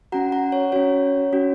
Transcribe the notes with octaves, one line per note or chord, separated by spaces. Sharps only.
C#4 F#4 F#5 A#5
F#5 A#5
C#5
C#4 F#4 C#5
C#4 F#4